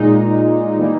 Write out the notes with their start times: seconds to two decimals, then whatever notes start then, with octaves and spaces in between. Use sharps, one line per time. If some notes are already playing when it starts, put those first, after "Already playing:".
Already playing: A#2 G#3 D#4
0.77 E3 G3 A#3 D#4